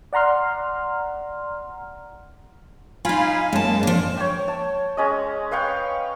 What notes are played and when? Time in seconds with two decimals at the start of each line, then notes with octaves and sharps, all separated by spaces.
0.13 D5 F#5 A#5 C6 F6
3.05 D#4 F4 F5 G#5 B5
3.53 F#2 G#3 A#3 A5
3.83 F3 D4
4.17 C#5 G5
4.48 A5
4.97 G#3 C#4 D#5
5.51 B4 F5 G5 C#6